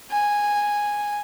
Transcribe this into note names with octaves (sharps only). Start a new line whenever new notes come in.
G#5